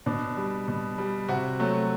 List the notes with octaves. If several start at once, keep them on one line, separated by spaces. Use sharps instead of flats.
B2 D4
G3
B2
G3
C3 F#4
F#3 A3